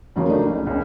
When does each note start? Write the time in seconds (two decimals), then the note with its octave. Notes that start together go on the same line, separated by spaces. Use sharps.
0.16 E2 C#3 F3 F#3 A#3
0.28 A3 D4 D#4
0.46 C#2
0.67 E1 C#2